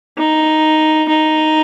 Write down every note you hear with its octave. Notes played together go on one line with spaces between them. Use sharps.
D#4
D#4